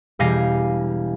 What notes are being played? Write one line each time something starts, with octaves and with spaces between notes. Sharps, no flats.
E1 G3 G4 F5 G#5 A#6